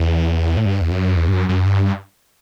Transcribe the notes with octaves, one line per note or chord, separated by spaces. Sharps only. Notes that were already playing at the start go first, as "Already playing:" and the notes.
Already playing: E2
A2
G2
E2
F#2
E2
G2
F#2
F#2
G2